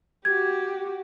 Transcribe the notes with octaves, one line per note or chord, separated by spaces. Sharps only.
F#4 G4 G#6